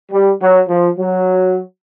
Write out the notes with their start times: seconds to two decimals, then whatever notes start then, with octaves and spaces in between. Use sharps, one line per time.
0.11 G3
0.40 F#3
0.68 F3
0.98 F#3